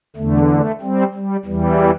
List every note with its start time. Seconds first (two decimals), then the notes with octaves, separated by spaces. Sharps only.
0.16 E2 D3 A3
0.49 A3
0.81 G3 C4
1.14 G3
1.45 E2 E3 G3